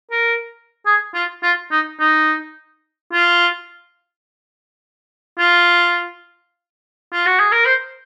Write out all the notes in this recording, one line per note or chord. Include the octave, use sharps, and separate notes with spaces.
A#4
G#4
F4
F4
D#4
D#4
F4
F4
F4
F#4
G#4
A#4
C5